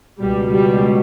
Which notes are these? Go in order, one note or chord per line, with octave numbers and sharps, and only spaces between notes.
C#2 B2 G3
G3